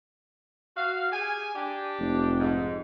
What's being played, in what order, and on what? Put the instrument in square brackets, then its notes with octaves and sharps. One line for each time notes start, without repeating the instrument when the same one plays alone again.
[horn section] F#4 F5
G4 G#4 G#5
D4 G4
[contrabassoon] F1
[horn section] G#2